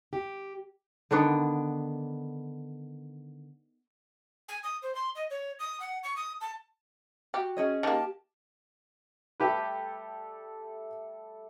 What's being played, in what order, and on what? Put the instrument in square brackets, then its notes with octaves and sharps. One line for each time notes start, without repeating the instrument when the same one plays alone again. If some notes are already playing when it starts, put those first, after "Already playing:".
[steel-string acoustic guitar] G4
[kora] D3 D#3 B3 D4
[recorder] G#5
D#6
C5
C6
D#5
C#5
D#6
F#5
C#6
D#6
A5
[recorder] F#4 [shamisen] G4
[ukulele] C#4 G#4 D#5
[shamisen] D#3 A#3 [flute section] G4 [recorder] A5
[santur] G3 A3 A4 [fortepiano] G4 B4